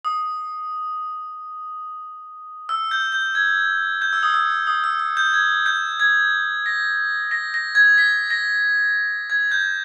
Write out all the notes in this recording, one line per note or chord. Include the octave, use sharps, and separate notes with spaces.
D#6
E6
G6
G6
G#6
G6
E6
D#6
E6
D#6
E6
E6
G6
G#6
G6
G#6
A#6
A#6
A#6
G#6
B6
A#6
G#6
G6